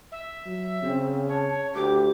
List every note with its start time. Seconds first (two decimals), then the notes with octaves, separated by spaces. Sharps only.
0.12 E5
0.46 F#3
0.83 C#3 C4
1.28 C#5 A5
1.75 D2 G4 D6